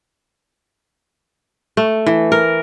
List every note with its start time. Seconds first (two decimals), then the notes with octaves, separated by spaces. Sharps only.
1.77 A3
2.06 E3
2.32 A#4